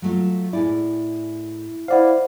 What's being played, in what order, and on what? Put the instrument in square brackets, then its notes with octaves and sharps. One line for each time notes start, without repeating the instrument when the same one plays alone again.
[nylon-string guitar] F#3 A3 F4
[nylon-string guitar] A2 G#4 D5 [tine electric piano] E4
[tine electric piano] E4 D5 F5 [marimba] C5 F#5